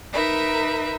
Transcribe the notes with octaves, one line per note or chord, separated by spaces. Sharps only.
D#4 A#4 B4 E5